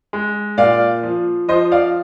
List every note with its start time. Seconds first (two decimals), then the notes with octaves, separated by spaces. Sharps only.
0.13 G#3
0.58 A#2 D5 F5
1.03 F3
1.48 F3 C5 D#5
1.72 D5 F5